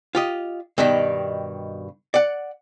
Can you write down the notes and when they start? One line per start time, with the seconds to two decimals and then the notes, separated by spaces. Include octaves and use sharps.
0.15 F4 G4 D#5
0.78 G2 B2 D#3 D#4 G4
2.14 D5 F#5